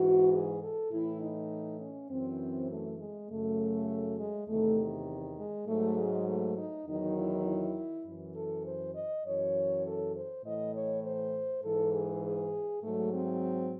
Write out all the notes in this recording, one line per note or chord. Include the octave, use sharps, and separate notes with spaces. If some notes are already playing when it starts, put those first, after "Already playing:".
Already playing: G#2 E3 F#4
G#4
A4
A2 E3 E4
D#4
C#4
F#2 E3 C4
A3
G#3
F#2 C#3 F#3 A3
G#3
E2 C3 D#3 A3
G#3
G#2 F#3 A3
G#3
A3
D#4
E2 D#3 F#3 D#4
E4
E4
F#2 E3
A4
C5
D#5
F#2 E3 C#5
A4
C5
A2 E3 D#5
C#5
C5
G#2 E3 A4
G#4
G#4
G#2 F#3 A3
C4